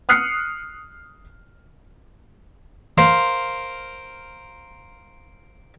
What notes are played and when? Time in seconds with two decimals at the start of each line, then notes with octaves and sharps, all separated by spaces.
0.09 D#6 F6 F#6 C7 C#7
2.98 A#4 C5 F5